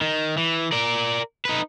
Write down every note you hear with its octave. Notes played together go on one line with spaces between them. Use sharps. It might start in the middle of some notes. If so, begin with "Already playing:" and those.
D#3
E3
A#4 D5
D#4 B4